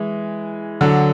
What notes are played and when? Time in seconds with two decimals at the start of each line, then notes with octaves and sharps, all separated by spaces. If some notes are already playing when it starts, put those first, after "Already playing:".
Already playing: E3 G#3
0.81 D3 F#3